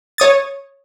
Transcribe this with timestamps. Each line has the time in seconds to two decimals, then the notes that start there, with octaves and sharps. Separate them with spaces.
0.18 C#5 D#6 A6